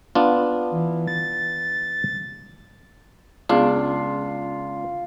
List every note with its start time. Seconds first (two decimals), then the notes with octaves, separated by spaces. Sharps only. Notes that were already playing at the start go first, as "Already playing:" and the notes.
0.15 B3 D4 F4
0.71 E3
1.08 A6
3.49 C#2 B3 D4 F4 G#4